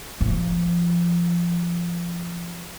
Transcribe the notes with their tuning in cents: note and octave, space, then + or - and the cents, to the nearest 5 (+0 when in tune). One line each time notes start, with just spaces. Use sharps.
F3 -20